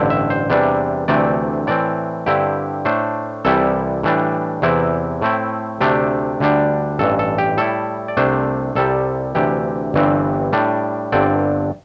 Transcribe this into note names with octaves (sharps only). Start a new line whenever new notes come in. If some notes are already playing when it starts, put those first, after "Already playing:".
Already playing: A1 G2 D3 C4 E4
E5
C5
E2 C3 E3 G3 D4
D2 C3 E3 A3 C4 D5
A2 E3 C4 D5
G2 D3 C4 E4 G4
A2 A3 D4 C5
C2 C3 E3 G3 E4 A4
A2 E3 G3 D4
E2 C3 E3 C4 E4
A2 A3 C4 E4
D2 C3 A3 D4 G4
D2 D3 G3 D4
A1 G2 E3 A4
A4
G4
A2 G3 E4 A4
D5
C2 C3 A3 D4 C5
C2 C3 G3 A4
D2 C3 E3 G4
G1 G2 E3 G3 C4
A2 G3 D4
G1 G2 D3 C4 D5